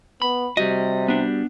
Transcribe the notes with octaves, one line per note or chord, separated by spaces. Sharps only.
B3 B5
C3 G3 F#4 D#5
B3 D4